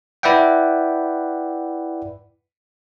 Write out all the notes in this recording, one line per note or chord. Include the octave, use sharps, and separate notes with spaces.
E4 B4 D5 E5 F#5 G5